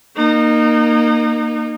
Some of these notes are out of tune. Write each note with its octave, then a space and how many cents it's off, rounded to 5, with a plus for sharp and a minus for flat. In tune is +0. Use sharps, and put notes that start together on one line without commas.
A#3 +0 D#4 -25